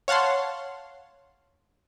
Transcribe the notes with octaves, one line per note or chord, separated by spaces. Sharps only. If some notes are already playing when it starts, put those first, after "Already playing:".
C#5 F5 F#5 A5 C6